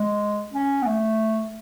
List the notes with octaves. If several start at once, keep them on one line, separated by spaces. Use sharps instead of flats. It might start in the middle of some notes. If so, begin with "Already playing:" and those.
Already playing: G#3
C#4
B3
A3